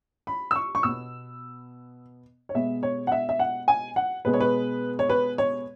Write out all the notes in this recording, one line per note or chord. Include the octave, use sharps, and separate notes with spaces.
B5
E6
C#6
C#6
B2 B3 E6
C#5
B2 G#3 B3 E5
C#5
F#5
E5
E5
F#5
G#5
F#5
B2 G#3 B3 B4
C#5
B4
C#5
B4
C#5